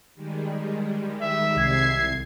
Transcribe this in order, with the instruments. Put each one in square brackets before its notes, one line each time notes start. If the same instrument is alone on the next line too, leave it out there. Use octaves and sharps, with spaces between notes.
[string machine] D#3 G3 G#3
[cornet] E5
[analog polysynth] C2 G#6 C7